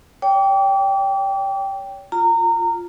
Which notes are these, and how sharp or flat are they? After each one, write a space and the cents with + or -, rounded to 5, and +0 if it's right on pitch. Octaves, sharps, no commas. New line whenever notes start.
C#5 +30 G5 +0 D6 -35
F4 +0 A#5 -25